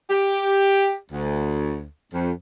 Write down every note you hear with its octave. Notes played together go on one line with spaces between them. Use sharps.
G4
D2
F2